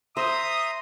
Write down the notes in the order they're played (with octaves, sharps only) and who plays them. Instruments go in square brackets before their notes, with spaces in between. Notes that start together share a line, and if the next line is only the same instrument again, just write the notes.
[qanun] C5 [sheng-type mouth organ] E5 A#5 C6 [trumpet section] D#6